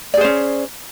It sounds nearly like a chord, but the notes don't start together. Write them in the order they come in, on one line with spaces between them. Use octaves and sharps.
D5 G#4 C5 C#4